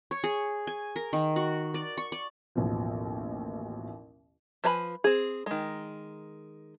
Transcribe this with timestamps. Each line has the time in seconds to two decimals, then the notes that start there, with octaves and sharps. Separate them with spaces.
0.11 C#5
0.24 G#4
0.67 G#5
0.96 A#4
1.13 D#3
1.36 F#4
1.74 D5
1.98 C#6
2.12 D5
2.55 A1 D#2 B2 F3
4.64 F3 B4 G#5 A#5 B5
5.04 C4 G#4
5.46 D#3 G#3